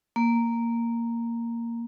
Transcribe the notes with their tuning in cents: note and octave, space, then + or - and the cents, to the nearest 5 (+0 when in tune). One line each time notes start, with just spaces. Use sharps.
A#3 -5